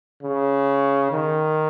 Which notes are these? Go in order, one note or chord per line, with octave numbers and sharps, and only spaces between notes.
C#3
D#3